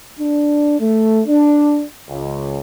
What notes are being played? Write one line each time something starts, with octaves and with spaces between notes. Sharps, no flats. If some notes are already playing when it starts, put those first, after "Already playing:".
D4
A3
D4
C#2